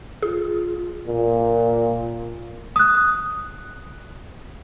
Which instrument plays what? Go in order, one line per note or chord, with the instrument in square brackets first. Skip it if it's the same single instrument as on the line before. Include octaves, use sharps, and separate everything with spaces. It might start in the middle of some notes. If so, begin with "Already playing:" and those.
[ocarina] F4 [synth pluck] G#4
[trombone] A#2
[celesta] D#6 F#6